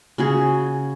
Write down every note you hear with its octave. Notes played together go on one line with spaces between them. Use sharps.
C#3 F#4 G#4